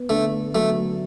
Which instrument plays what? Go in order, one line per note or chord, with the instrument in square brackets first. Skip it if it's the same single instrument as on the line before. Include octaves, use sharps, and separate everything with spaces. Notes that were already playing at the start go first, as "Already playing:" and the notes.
Already playing: [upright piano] B3
[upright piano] D3 [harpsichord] A3
[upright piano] F#3 [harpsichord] A3